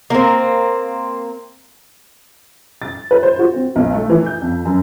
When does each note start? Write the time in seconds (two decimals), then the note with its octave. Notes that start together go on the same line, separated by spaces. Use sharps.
0.10 A#3 C4
2.82 A6
3.11 B4
3.23 C5
3.39 F#4
3.54 C4
3.76 B1
3.93 A3
4.10 E3
4.26 G6
4.42 F2
4.65 F#2